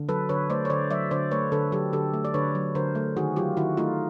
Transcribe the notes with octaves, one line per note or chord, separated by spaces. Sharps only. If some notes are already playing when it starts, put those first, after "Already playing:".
Already playing: D3
F#3 A4 B4
D3 B4 C#5
A3 C5 D5
C#5
D3 C5 D5
F#3 D5 E5
D3 C5 D5
A3 B4 C#5
D3 A4 B4
F#3 G4 A4
D3 G4 A4
A3
D5
D3 B4 C#5
F#3
D3 A#4 C5
A3
D#3 F#4 G#4
F#3 F4 G4
D#3 E4 F#4
A3 D#4 F4